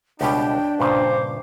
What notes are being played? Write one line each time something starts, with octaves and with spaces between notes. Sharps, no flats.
C#2 B2 G3 D4 G5
G2 A#2 C#3 C5 D6